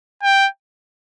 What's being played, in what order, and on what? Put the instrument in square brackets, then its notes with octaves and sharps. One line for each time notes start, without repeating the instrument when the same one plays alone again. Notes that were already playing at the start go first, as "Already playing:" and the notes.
[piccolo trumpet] G5